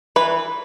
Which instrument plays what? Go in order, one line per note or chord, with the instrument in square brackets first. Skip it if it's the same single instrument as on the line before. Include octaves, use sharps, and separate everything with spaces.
[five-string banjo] E3 B4